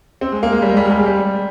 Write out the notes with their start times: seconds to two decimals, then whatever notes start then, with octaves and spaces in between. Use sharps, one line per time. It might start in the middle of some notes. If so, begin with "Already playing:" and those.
0.21 C4
0.32 G#3
0.43 A#3
0.52 G#3
0.62 G3
0.69 G#3
0.77 G3
0.85 G#3
0.91 G3
0.99 G#3
1.06 G3